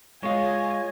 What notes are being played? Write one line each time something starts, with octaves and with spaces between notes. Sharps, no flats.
G#3 F4 C#5 D#5 G#5